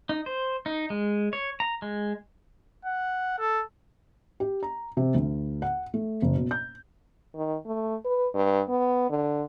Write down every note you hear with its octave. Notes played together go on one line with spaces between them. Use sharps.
D#4
C5
D#4
G#3
C#5
A#5
G#3
F#5
A4
G4
A#5
C3
D2
F#5
A3
F#1
B2
G6
D#3
A3
B4
G2
B3
D3